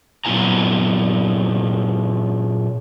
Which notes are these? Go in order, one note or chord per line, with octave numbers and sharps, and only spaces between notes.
A#2 F#3 B3 E4 G#5 A#5